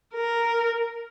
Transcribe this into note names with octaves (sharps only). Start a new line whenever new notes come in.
A#4